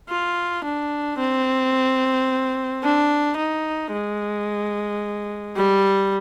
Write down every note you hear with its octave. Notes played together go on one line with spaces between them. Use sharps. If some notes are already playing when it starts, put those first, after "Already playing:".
F4
D4
C4
D4
D#4
G#3
G3